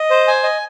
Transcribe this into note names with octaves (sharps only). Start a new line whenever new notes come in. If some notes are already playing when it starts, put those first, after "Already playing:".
Already playing: D#5
C5
G#5
D#5